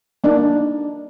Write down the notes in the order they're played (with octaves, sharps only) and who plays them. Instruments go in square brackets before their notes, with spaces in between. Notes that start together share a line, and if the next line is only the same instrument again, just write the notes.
[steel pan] A#3 D4 D#4